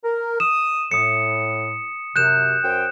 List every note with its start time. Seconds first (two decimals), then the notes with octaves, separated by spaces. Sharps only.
0.04 A#4
0.40 D#6 E7
0.91 A2 D#6 C#7
2.16 F#2 C3 F#6 G6 E7
2.64 F#2 C5 G5